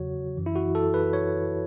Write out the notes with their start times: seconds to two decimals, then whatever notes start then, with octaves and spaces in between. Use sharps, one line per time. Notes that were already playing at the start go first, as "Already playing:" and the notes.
Already playing: E2 C#3 F#3 F#4 C#5
0.37 F#2 E3
0.46 E4
0.55 F#4
0.75 A4
0.94 B4
1.13 C#5